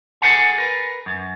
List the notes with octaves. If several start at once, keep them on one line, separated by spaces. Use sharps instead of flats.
G#4 A4 B4 F5 F#5 G#5
A#4 B4
F#2